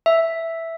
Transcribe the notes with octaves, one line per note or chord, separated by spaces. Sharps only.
E5